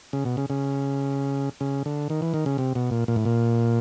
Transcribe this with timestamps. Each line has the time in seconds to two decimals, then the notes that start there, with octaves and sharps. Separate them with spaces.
0.13 C#3
0.25 B2
0.37 C#3
0.50 C#3
1.61 C#3
1.86 D3
2.10 D#3
2.22 E3
2.34 D#3
2.46 C#3
2.58 C3
2.75 B2
2.91 A#2
3.08 A#2
3.16 A2
3.25 A#2